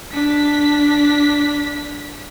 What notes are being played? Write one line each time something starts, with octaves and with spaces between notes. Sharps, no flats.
D4 B6